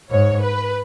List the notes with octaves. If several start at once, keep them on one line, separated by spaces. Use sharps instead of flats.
G#2 C#5
B4